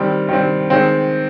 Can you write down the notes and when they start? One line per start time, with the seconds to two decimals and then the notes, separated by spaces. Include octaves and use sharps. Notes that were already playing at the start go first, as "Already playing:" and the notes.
Already playing: D#3 G3 C4
0.29 D#3 G3 C4
0.70 D#3 G#3 C4